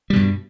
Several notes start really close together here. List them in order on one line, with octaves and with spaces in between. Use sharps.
G3 B2 G2